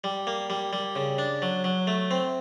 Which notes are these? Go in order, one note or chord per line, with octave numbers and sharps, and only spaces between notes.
G3
A#3
G3
G3
C#3
D4
F#3
F#3
A3
C4